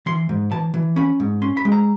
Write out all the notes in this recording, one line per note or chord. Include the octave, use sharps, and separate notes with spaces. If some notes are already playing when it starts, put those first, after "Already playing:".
E3 C6
G#2
E3 A5
E3
C#4 B5
G#2
C#4 C6
B5
G#3
A#5